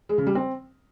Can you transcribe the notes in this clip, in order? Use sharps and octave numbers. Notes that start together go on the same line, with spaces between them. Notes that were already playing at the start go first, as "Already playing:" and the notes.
G#3
C#3
G3
C4